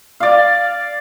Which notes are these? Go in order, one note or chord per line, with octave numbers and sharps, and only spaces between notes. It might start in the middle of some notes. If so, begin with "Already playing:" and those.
D5 F5